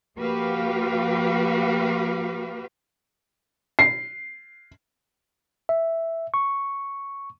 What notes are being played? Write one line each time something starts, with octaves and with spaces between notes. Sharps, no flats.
F3 A#3 F#4 G4 B4 F5
C7
E5
C#6